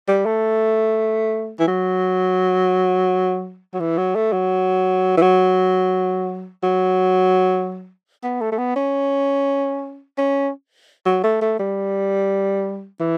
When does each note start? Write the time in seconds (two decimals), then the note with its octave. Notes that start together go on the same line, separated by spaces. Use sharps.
0.08 G3
0.26 A3
1.59 E3
1.68 F#3
3.74 F#3
3.80 E3
3.98 F#3
4.16 A3
4.33 F#3
5.18 E3
5.22 F#3
6.63 F#3
8.23 B3
8.41 A3
8.52 A3
8.58 B3
8.76 C#4
10.18 C#4
11.06 F#3
11.24 A3
11.41 A3
11.60 G3
13.00 E3